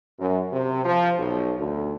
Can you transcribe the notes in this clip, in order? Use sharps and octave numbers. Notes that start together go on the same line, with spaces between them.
F#2
C3
F3
B1
D2